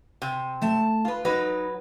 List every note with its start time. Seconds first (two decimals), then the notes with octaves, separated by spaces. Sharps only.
0.22 C3
0.62 A3 A5
1.05 F4 B4
1.25 F#3 D#4 B4